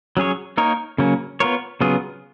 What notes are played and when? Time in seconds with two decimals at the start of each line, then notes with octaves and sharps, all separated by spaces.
0.17 F#3 C#4 G#4 C#5
0.57 A#3 D#4 A#4 C#5
0.98 C#3 F#3 A#3 C#4
1.40 B3 F4 A#4 C#5
1.81 C#3 F#3 B3 F4 G#4